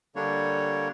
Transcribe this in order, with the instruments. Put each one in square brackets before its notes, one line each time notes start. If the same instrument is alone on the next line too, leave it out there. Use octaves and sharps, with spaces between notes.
[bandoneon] D3 G3 A#3 D4 C#5